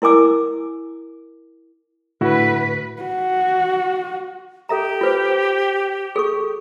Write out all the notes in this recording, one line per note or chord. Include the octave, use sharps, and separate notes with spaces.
E4 A#4 G#5 D6 E6
A2 D3 E4 F#4 B4
F#4
G4 A4 E5 A#5
F4 B4 C5
G#4 A4 C#6